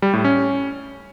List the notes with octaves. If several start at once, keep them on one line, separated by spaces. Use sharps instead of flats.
G3
A2
C#4